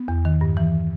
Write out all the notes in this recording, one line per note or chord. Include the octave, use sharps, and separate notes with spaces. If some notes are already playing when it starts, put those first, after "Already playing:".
Already playing: B3
E2
D#3
G2
E3